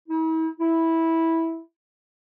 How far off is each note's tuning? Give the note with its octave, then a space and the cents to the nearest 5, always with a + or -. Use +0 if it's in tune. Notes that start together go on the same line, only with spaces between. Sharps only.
E4 -45
E4 -10